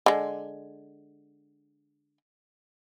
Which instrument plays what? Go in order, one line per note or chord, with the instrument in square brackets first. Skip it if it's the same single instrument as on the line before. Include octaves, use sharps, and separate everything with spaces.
[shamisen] D3 G#3